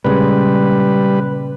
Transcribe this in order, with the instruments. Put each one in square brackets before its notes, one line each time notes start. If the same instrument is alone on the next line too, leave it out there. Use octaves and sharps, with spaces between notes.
[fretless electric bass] A#2 C#3 G#3 [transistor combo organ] G3 B4